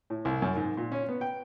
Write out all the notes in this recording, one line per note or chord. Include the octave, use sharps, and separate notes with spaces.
A2
C2
F#2
G#2
A#2
C#4
B3
G5